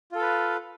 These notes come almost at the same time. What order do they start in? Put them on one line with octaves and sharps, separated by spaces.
F4 A4 F5 B4